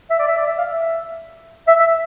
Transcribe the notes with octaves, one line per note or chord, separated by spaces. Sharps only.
E5
D5
E5
D5
E5
F5
E5
E5
E5